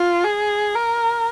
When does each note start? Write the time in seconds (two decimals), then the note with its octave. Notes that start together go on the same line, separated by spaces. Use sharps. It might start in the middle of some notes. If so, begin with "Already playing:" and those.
Already playing: F4
0.24 G#4
0.75 A#4